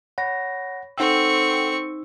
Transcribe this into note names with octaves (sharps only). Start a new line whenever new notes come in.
C#5 F#5 B5 A#6
C4 D#4 A4 F#5 G5 C#6 E6